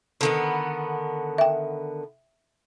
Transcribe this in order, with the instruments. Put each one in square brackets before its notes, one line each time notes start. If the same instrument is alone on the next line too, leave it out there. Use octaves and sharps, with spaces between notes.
[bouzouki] D3 D#3 B3
[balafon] E5 G5